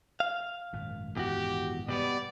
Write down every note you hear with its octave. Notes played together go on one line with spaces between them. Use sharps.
F5
G#1 F#2 A#2
E2 F#4 G4
B2 G3 B3 D5